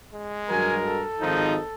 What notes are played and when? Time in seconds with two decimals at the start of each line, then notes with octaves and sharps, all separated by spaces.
0.13 G#3
0.49 G2 F#3 F#4 A#4 G#5
0.85 A4
1.21 G#1 F3 D#4